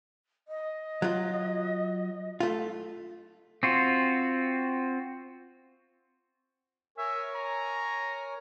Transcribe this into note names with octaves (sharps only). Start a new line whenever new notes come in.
D#5
F#3 F4
A3 F4
C4 F4 F#4
A#4 C#5 E5 G#5
A#5